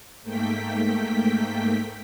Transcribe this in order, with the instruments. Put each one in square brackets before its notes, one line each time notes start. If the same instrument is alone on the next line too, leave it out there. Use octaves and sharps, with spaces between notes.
[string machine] G#2 A3 A#3 G5 B6